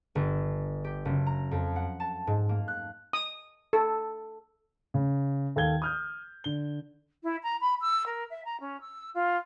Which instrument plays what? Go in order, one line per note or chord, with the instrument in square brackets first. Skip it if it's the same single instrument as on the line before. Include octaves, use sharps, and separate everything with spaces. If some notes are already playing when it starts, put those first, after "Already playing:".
[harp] G1
G4
F#1
A#5
F2
F#5
A5
G#2
A#3
F#6
[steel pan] D#6
A4
[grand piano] C#3
D#2 A4 F5 G5 G#6 G7
D#6 F6 G6
D3 G7
[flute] E4
A#5
B5
E6
A#4
E5
A#5
C#4
E6
F4